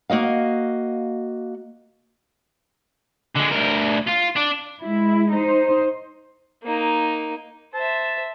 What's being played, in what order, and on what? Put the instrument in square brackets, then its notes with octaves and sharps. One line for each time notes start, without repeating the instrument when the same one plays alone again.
[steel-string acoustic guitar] A#3 F#4 D#5 F5
[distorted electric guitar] D3 G#3
D2 A#4
F4
D4
[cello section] G#3 E4
D#4 C5
[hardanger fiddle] A#3 D#4
[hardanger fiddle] C5 E5 [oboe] A5